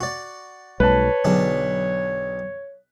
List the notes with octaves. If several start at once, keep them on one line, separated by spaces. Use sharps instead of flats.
F#4 D5
B1 G3 A3 B4 C#5 A5
B1 D3 F#3 D4 G#4